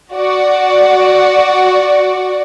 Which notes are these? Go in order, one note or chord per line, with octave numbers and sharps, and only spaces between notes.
F#4 D5